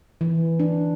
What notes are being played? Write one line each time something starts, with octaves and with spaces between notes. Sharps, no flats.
E3
D4